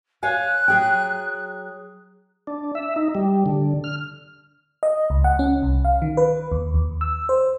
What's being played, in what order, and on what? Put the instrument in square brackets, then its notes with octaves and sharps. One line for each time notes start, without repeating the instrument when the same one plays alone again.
[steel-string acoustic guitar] C#5 F5 G#5 [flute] F#6
[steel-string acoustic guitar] F#3 G#4 G5
[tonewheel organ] D4
E5
D#4
G3
D3
F6
[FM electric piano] D#5
C#2
F#5
C#4
C2
F5
D#3
B4
D#2
D#2
E6
C5